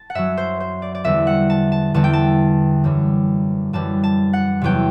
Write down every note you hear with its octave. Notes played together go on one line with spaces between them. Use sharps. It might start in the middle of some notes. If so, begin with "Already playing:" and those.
Already playing: A5
F#5
F#2 F#3 E5
C5
C5
D5
D5
E2 D3 G3 E5
F#5
A5
A5
E2 D3 G3 A5
G5
A5
F#2 E3 G3
F#2 E3 G3 A5
A5
F#5
E2 C3 F#3 G5